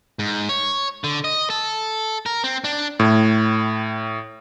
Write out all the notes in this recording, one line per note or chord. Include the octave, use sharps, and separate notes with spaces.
G#2
C#5
D3
D#5
A4
A#4
C4
D4
A2